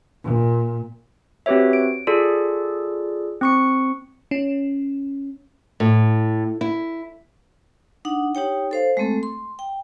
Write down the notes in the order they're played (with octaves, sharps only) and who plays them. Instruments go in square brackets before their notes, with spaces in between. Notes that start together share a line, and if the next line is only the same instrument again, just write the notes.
[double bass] A#2
[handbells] C4 F#4 G4 B4 C#5 E5
D7
F4 G#4 A4 D5
C4 C#6 C#7
[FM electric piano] C#4
[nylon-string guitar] A2
E4
[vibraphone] D4 D#4 F#5
D#4 G4 C#5 G5
A4 C5 F5
G#3 A3 C4 A4
C6
G5